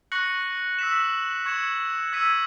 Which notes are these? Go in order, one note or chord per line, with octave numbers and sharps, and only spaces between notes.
C#6 F#6 A#6 C#7 F#7
E6 B6 E7
C#6 G#6 C#7 E7
E6 G#6 B6 D#7